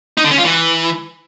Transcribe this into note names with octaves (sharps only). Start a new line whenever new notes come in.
D#4
D3
C#4
F4
E3